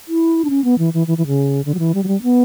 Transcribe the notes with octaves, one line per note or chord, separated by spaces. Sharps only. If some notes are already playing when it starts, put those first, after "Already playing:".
E4
D4
C#4
B3
E3
E3
E3
E3
C#3
D3
F#3
E3
G3
F#3
G3
B3